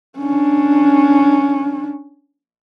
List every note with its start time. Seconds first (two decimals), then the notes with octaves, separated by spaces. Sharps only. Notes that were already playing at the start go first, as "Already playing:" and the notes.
0.19 C#4 D4